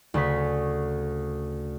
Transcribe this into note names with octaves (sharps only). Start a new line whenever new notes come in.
D2 C#3 C#6 B6